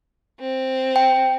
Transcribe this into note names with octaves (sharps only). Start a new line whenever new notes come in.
C4
G5